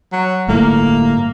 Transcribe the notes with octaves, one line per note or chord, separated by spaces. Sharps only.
F#3
G1 A2 A3 A#3